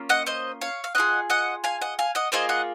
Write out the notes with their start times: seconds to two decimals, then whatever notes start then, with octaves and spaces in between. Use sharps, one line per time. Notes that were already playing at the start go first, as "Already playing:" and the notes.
Already playing: A#3 C#4 F4
0.09 D#5 F#5
0.26 C5 D#5
0.61 C#5 F5
0.84 F5
0.95 C#4 F4 G#4 D#5 F#5
1.30 D#5 F#5
1.64 F5 G#5
1.81 D#5 F#5
1.99 F5 G#5
2.15 D#5 F#5
2.32 A#3 F4 G#4 C5 D#5
2.49 D#5 F#5